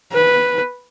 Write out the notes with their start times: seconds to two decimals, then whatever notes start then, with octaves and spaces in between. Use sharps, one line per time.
0.13 B4